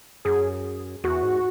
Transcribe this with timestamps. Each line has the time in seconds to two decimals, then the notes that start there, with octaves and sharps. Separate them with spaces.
0.25 F#2 G#4
1.04 E2 F#4
1.23 G#2